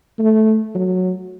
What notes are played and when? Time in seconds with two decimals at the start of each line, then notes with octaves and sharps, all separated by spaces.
0.19 A3
0.75 F#3